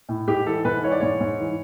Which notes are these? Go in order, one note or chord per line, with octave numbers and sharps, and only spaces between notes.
A2
G#2 G4
E3 A4
G#2 B4
E3 C#5
D5
G#2 C#5
G#2
E3